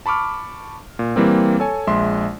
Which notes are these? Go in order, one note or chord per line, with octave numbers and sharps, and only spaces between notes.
A5 B5 C#6 D6 F6
A#2
E3 G3 A#3 C4
A4 C#5 G#5
A#1 G#3 E5 C6